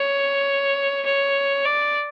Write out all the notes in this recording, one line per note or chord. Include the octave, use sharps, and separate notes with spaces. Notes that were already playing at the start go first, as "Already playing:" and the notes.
Already playing: C#5
C#5
D5